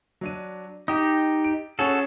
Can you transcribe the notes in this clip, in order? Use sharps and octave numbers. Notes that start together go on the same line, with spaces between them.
F#3 D4 D#7
D#4 G4 D#6
D7
C#4 F#4 G#4 A4 C#5